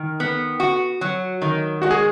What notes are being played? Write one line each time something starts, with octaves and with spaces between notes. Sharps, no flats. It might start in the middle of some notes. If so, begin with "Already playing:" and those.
Already playing: D#3
B3
F#4
F#3
D#3
G#3 F#4
G#4